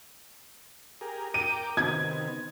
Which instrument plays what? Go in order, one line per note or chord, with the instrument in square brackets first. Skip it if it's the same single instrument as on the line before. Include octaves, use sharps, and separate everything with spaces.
[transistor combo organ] G4 G#4 A#4
[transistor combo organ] A#4 G5 D6 [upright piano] D#7
[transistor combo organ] C3 D#3 B3 [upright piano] G#6